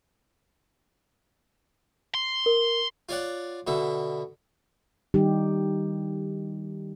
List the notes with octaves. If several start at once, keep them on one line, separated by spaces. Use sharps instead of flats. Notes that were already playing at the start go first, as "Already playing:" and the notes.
C6
A#4
F4 C#5 D5 F#5
B2 D3 E5
D#3 G3 D#4 G4